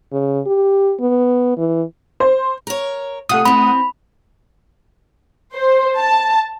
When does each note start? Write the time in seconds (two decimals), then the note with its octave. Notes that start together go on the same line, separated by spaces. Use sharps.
0.12 C#3
0.47 G4
1.00 B3
1.57 E3
2.20 C5
2.67 A#4 C#5
3.29 C3 A3 F4 F#5 D#6
3.45 E3 C4 B5
5.54 C5
5.97 A5